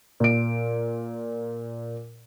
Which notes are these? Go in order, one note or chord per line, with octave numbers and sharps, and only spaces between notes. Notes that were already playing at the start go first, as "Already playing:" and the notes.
A#2 D7